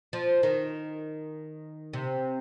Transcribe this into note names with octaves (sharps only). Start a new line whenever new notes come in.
F3
D#3
C3